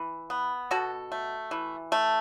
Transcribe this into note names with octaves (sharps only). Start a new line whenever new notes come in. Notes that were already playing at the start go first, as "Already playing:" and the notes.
Already playing: E3
B3
B2 F#4 A4
A3
E3
A3